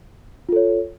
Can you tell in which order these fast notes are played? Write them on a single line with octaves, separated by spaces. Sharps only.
F4 A4 C#5